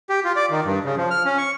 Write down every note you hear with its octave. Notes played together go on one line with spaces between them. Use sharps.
G4
F4
D5
D#3
G2
C#3
F3
F6
C#4
C#6